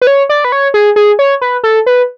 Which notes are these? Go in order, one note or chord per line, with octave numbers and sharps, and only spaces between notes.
B4
C#5
D5
B4
C#5
G#4
G#4
C#5
B4
A4
B4